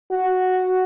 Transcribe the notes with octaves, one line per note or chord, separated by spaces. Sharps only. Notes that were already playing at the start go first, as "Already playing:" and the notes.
F#4